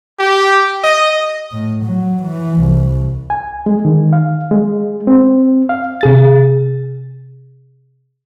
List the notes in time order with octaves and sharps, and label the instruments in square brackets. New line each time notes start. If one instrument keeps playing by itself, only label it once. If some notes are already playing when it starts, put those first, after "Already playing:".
[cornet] G4
D#5
[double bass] A2
F#3
E3
C2
[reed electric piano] G#5
G#3
D#3
F5
G#3
C4
F5
[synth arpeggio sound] C3 G#4 A6